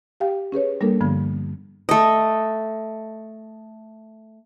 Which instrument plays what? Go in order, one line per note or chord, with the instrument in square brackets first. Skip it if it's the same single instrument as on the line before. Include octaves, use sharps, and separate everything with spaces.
[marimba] G4 F5 G5
C#4 G#4 B4 C#5
G3 A#3 D4 A4 A#4
G2 D3 F3 B3
[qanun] A3 D#5